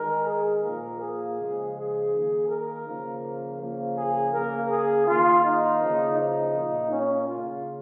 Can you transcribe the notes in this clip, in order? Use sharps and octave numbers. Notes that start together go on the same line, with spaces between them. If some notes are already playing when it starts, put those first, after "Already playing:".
Already playing: D#3 G#3 A#4
G#4
A#2 F3 A#3 A#4
G#4
C#3 F3 G#3
G#4
D#3 A#3
A#4
C#3 F3 A#3
C#3 F3 A#3
G#4
C#3 A#3 A#4
G#4
D#3 A#3 F4
D#4
C#3 F3 A#3
D#4
A#2 A#3
C#4
C#3 A#3 F4